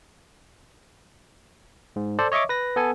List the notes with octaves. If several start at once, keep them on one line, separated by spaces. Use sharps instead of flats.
G#2
A4 C5 D5
C#5 D#5 E5 C#6 D6
B4 A#6
B3 A4 G#5